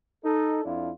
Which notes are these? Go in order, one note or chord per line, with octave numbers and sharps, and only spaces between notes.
D#4 A4
F2 D4 E4 F4